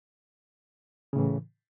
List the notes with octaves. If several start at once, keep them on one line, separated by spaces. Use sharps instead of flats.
A2 C#3 E3